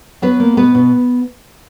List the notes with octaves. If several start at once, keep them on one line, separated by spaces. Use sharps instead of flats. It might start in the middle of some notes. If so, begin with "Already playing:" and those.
F#3 B3 B4
A#3
B2 B3 B4
B2